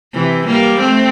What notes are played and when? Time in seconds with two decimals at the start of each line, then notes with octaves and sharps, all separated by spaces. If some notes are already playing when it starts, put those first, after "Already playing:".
0.13 C3 E3
0.47 G3 A#3
0.80 A3 C4